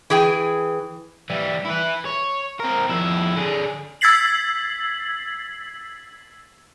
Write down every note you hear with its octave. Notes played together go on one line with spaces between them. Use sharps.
E3 G#4 G5
E3 G3
E4 B4
C#5
C4 A#4
F2 E4
D3 G#4
E6 G#6 A6 B6 C7 F#7